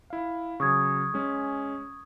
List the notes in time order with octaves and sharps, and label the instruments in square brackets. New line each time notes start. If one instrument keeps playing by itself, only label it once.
[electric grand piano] E4 F5
[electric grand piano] C#3 F#3 [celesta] C#6 D#6 G#6
[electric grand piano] G#3 C#4